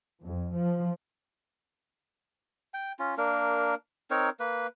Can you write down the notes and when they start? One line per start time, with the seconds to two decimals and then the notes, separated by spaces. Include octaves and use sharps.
0.23 F2
0.54 F3
2.74 G5
2.99 C#4 F4
3.18 A#3 D4 A#4
4.11 C4 D#4 A#4 C#5
4.40 A#3 B4